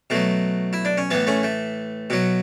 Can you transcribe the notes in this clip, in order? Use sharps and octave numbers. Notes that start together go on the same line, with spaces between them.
B2 F#3 A3
E4
D4
C#4
A2 E3 B3
A3 C#4
A3
B2 F#3